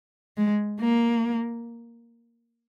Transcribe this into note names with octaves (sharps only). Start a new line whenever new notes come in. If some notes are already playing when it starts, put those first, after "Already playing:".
G#3
A#3